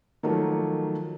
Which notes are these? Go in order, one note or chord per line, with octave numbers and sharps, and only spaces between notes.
D#3 F3 F#3 A3 A#3